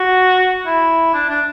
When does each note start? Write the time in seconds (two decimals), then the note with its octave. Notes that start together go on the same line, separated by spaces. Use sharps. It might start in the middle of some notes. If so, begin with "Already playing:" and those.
Already playing: F#4
0.66 E4
1.14 D4
1.29 D4